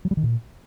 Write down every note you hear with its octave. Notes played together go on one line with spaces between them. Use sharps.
F#3
G3
D#3
A#2